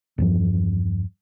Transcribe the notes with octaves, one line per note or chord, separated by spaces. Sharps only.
E2 G2 F3